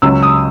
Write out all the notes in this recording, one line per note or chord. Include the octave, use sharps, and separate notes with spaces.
C#2 C#3 F#3 E6
D#6